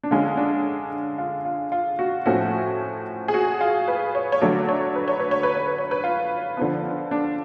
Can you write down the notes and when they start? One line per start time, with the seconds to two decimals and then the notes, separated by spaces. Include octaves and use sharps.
0.03 D4
0.11 D3 G#3 C#4 F4
0.37 D4
1.18 F4
1.45 F4
1.72 F4
1.99 F#4
2.26 A2 F3 A3 C#4 F#4
3.28 G#4
3.34 F#4
3.61 F4
3.88 B4
4.15 C#5
4.32 C#5
4.41 D3 F#3 A3 D5
4.69 C#5
4.95 B4
5.08 C#5
5.20 B4
5.31 C#5
5.43 B4
5.55 C#5
5.67 B4
5.78 C#5
5.91 B4
6.04 F4
6.57 D3 F3 B3
7.11 D4